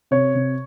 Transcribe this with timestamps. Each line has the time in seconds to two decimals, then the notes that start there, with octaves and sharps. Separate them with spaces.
0.11 C3 C#5
0.35 C3